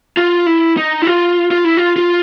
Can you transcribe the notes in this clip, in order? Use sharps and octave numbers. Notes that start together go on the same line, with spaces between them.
F4
E4
D#4
E4
F4
F4
E4
F4
F4